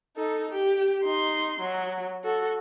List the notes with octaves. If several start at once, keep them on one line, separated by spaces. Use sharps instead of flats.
D#4 A4
G4
D#4 C6
F#3
F#4 A4